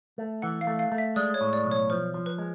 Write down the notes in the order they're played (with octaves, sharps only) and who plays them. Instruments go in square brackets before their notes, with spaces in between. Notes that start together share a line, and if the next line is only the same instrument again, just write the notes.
[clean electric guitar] A3
[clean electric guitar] E3 [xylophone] F#5
[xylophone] F5
[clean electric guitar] A3
[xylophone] F5
[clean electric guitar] A3
[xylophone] E5
[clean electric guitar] G#3 [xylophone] D5
[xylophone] C#5
[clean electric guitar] A2
[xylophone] D5
[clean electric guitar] B1
[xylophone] C#5
[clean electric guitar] F3 [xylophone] C5
[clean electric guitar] F3
[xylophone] B4
[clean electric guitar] G#3